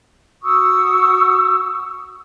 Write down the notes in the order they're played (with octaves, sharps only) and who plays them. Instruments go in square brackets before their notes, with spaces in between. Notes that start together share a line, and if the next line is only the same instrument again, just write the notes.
[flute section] F#4 C#6 D#6 E6